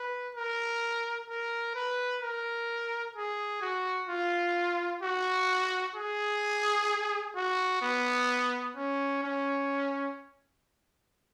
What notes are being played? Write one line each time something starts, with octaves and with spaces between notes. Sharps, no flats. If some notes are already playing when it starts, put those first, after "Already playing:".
Already playing: B4
A#4
A#4
B4
A#4
G#4
F#4
F4
F#4
G#4
F#4
B3
C#4
C#4